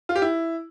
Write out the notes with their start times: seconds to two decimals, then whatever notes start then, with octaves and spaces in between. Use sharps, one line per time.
0.09 F4
0.16 G4
0.22 E4